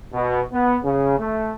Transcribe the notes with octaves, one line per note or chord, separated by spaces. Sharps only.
B2
B3
C#3
A3